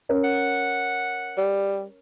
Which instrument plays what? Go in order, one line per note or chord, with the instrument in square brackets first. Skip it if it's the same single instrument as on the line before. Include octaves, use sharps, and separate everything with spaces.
[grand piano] C#4 A#4
[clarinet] F#5
[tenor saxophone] G3